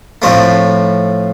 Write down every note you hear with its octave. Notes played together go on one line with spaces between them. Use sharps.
A2 F3 A3 C4